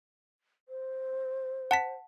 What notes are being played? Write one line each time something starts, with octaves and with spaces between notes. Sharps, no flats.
C5
F#5 A5 B6